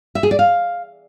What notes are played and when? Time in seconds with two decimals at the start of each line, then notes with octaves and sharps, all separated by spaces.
0.15 E5
0.23 G#4
0.31 D5
0.39 F5